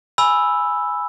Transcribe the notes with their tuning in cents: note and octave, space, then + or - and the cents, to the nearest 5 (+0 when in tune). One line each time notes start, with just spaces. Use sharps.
G#5 +0 B5 +0 E6 +0